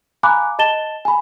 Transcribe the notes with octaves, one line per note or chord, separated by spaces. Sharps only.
F5 G#5 A#5 B5 D6 F#6
D#5 A5 A6 E7 G7
G#5 B5